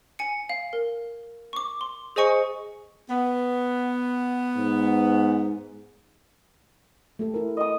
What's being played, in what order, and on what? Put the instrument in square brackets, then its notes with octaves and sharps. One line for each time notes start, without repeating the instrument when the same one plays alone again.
[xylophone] G#5 C#7
F5
A#4
C#6 D6
C6
G#4 C5 D#5 G#5 C#6 C#7
[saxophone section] B3
[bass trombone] G#2
[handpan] A3 G4 A4
E4 A#4
[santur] D#5 D#6